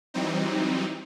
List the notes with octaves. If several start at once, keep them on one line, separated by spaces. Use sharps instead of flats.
E3 F#3 G3 C4 D#4